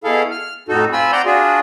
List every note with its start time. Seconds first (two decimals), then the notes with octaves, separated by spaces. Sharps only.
0.04 B2 E4 G#4 A4 F5
0.31 F6
0.69 F2 A2 D#4 F#4 A4
0.93 C4 F4 G#5 B5 E6
1.12 D5 F#5 A#5 C6 G6
1.25 D4 F4 F#4 G#4